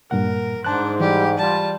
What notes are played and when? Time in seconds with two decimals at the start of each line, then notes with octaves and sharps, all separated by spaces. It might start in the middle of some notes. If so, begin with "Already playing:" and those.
0.11 G2 A#2 A#4 F#5
0.65 G#2 D4 C5 A5 F#6
1.00 E3 G3 G4
1.38 G3 F4 A5